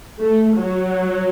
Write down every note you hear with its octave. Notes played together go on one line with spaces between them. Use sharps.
A3
F#3